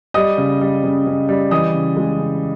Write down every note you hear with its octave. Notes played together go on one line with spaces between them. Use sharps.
G3 D#5 D#6
C#3
G3
C#3
C#3
G3
E3 D#5 D#6
C#3
G#3
C#3